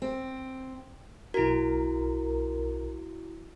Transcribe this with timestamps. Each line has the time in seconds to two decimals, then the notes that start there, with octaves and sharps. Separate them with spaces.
0.02 C4
1.34 B1 E4 F#4 A#4